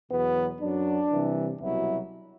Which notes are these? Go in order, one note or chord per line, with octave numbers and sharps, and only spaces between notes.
E2 B2 F#3 B3
F#2 F#3 D4
C2 C3 E3
C2 B2 F#3 E4